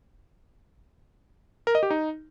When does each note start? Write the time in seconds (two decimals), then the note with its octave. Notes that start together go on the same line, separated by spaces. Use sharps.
1.67 A#4
1.75 D#5
1.83 G4
1.90 D#4